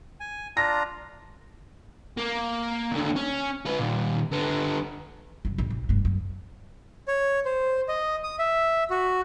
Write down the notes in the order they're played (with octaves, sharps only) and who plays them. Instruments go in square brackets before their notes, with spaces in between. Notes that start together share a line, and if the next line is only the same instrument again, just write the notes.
[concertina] G#5
[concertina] D4 F4 A#5 [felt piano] A#6
[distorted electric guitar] A#3
D#2 D3
C#4
F4 B4
A#2 D#3
D3 B3
[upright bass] F#2 C3
A#1
B1
E1 G2
F#2
[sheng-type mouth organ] C#5
C5
D#5
D#6
E5
F#4